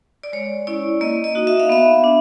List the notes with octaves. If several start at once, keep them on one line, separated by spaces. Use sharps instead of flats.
D5
G#3 C#5
C#4 E4 D5
A#3 D#5
D#5
D#4 F#4
E5
F5
B3 E5
D4